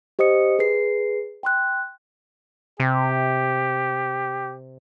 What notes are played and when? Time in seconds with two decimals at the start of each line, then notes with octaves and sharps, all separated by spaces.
0.19 G4 C5 D#5 D#6 C#7
0.59 G#4 B4 C7
1.43 G5 C6 F#6
2.80 C3 G4